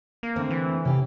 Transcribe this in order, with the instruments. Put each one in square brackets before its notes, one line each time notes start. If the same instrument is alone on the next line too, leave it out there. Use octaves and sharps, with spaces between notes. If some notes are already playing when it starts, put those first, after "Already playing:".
[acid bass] A#3
[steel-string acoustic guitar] D3 A3 C4
[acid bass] E3
[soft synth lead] C3 [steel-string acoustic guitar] C#4 G4